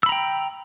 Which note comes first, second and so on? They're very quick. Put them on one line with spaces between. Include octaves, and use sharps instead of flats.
E6 B5 A#5 G5